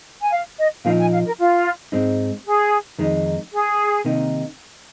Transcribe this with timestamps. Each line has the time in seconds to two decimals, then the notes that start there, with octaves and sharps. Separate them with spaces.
0.20 G#5
0.32 F5
0.59 D#5
0.85 A#2 F3 A#3 D#4 F5
0.99 G#5
1.13 F5
1.26 A#4
1.38 F4
1.92 G#2 G#3 C4 D#4
2.45 G#4
2.99 F2 D#3 G#3 D#4
3.52 G#4
4.05 C3 D#3 A#3 D#4